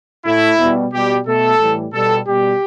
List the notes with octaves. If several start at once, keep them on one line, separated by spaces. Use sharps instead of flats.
A2 A3 E4
B2 G3
B2 G3 G4
B2 A3 A4
A2 E3 G3
B2 G3 A4
B2 G3 G4